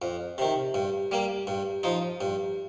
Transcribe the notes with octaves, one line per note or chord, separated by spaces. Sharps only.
F2
C3 D#3
G2
G3 A#3
G2
F3 D#4
G2